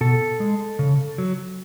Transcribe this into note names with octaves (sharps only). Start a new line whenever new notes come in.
B2 A4
G#3
C#3
F#3